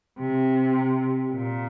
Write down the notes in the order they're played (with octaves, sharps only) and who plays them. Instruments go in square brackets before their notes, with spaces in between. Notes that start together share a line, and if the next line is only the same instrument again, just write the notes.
[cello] C3
A#2